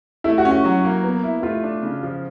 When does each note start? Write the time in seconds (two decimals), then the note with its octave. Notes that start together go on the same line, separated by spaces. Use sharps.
0.24 A3 E4
0.38 F#4
0.45 C#4
0.51 F#4
0.64 F#3 F#4
0.85 A#3
1.04 B3
1.23 E4
1.43 A3 F4
1.64 D4
1.83 C#3
2.03 F3